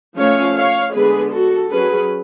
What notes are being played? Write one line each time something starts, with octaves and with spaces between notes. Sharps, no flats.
F3 A3 C#4 C#5 F5
C#5 F5
D3 G#3 B3 G#4 B4
F#4 A4
F#3 C#4 G#4 B4